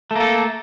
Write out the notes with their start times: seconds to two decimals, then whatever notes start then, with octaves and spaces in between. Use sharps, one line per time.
0.11 A3
0.16 A#3
0.20 A4